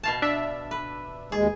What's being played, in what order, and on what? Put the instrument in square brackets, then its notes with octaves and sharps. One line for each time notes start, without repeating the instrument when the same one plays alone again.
[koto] B2 F5 A5
[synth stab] D4 E5
[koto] B4
[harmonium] D#2 G#3 [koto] G#4